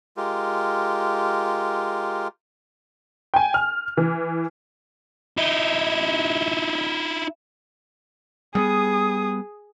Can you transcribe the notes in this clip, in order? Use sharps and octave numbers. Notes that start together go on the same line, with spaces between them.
G#3 F4 G4 A#4
G5 G#5
F6
E3
D#4 E4
G3 A#3 B3 G#4 D#6